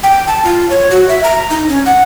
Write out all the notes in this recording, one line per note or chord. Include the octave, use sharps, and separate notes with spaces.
G5
A5
F4
C#5
F#4
E5
A#5
D#4
C#4
F#5